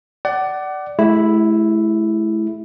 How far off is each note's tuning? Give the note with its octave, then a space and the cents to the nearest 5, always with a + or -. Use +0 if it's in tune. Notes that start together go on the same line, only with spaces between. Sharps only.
D5 +0 F#5 +30
A3 -45 E4 +0 G4 +25